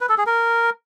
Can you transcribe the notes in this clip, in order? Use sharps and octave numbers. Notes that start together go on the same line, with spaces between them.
B4
A4
G#4
A#4